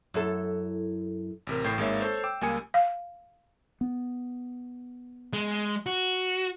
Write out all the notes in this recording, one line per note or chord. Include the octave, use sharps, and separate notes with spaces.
F#2 E4 A4
A1 C3 A#4
A1 A2 G5 G6 C7
G#1 G#3 A#3 D#4 C#5 E5
A4 C5 C#5
G5 D6 E6
C#2 G3 A#3 G#5 D#6 C#7
F5
B3
G#3
F#4